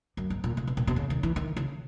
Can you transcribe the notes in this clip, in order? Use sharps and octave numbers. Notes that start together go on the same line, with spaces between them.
F#2
G#2
A#2
C#3
B2
A#2
B2
C#3
D#3
E3
D#3
C#3